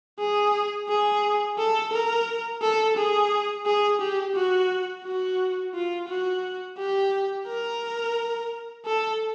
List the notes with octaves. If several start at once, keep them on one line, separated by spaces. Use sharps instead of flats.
G#4
G#4
A4
A#4
A4
G#4
G#4
G4
F#4
F#4
F4
F#4
G4
A#4
A4